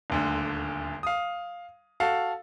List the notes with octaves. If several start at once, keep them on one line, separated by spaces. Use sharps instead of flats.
D#1 D2 D3
F5 D#6
F#4 A4 F5